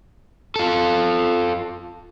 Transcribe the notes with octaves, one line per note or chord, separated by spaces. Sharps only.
F4 A4